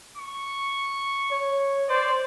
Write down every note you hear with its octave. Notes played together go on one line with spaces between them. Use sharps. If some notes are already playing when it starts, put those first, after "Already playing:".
C#6
C#5
C5 D5